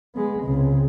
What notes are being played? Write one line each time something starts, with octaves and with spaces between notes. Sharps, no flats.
G#3 B3
C#2 C3